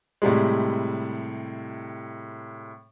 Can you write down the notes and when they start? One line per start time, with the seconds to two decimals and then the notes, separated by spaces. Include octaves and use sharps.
0.22 A2 C3 G3 G#3